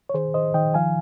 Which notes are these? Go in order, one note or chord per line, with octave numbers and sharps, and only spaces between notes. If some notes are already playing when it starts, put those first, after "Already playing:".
C#5
D#3 G#4 C5
D#3 C5 D#5
D#3 D#5 G5
F3 F5 G#5